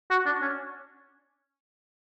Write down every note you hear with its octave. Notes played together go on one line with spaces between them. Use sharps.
F#4
D4
C#4